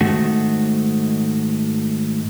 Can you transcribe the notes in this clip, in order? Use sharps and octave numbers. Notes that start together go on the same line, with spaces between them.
G#2 D#3 A3 F#4